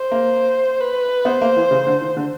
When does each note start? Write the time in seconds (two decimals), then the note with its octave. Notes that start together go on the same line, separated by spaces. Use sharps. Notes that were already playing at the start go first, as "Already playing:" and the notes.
Already playing: C5
0.11 A#3
0.80 B4
1.25 B3 C5
1.42 A#3
1.57 E3
1.71 C#3
1.87 D3
2.01 D#3
2.17 D3